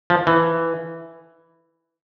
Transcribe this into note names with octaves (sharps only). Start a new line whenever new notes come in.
F3
E3